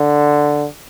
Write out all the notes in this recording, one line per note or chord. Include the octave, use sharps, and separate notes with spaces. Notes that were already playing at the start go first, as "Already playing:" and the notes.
Already playing: D3